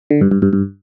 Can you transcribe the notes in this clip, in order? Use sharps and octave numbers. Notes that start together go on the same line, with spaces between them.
D3
G2
G2
G2
G2